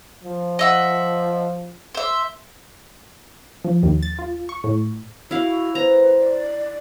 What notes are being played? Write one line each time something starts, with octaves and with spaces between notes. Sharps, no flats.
F3
D#5 E5 F#5
C5 E5
F3
D#2
A6
F4
C#6
A2
E4 F#4 F5
B4 C5 A#5
D5